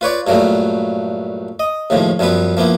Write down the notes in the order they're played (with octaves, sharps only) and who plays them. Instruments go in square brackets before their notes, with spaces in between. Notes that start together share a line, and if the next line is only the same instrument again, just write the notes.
[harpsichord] F4 B4 C#5 D5
G2 A#2 F#3 G3 A3
D#5
D#2 A2 C#3 F3
F#2 F3 G3 B3 B4
F3 A#3 B3 E4